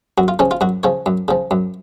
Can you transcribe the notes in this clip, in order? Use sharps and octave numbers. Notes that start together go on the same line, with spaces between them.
F#2 F#4
F4
C#3 F3 C#4
F4
F#2 F#4
C#3 F3 C#5
F#2
C#3 F3
F#2